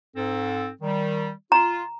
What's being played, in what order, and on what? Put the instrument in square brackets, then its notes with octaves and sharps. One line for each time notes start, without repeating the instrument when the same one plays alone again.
[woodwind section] G#2 C4 A4
D#3 G3
[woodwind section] F4 [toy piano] A#5